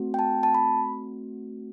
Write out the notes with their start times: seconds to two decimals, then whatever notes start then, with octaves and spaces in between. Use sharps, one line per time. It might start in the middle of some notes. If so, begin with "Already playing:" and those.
Already playing: A3 C4 F#4
0.14 G5
0.19 A5
0.43 A5
0.54 B5